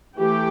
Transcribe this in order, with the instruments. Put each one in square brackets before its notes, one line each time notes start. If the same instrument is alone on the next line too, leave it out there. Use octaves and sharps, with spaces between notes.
[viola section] E3 A3 G4